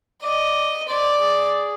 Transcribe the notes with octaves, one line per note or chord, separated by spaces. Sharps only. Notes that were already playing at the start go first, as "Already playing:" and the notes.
D5 D#5
C5 D5
G#4